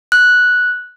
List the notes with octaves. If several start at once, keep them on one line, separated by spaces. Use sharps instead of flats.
F#6